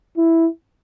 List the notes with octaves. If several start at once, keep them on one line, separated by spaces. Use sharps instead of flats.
E4